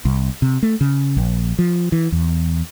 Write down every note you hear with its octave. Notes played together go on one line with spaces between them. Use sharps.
C2
C3
A3
C#3
A#1
F3
E3
E2